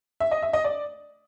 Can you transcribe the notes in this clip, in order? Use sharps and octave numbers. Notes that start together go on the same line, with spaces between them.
E5
D#5
E5
D#5
D5